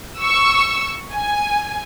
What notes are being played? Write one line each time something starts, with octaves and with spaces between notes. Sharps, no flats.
C#6 E6
G#5